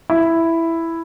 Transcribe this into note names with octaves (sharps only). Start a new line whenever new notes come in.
E4